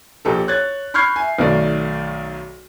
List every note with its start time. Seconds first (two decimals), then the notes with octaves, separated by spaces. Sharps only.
0.25 A#1 G4 A4
0.48 C#5 F#6 G#6 A6
0.94 B5 C#6 F6 G6 G#6 C7
1.16 E5 G#5
1.39 B1 D#3 A3 D5